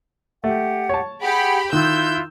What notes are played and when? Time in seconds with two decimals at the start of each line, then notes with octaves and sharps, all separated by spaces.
0.44 A3 G4 F#5
0.89 C#5 A5
1.21 G4 G#4 F#5 B5
1.73 D#3 E4 F4 E6 F#6 G6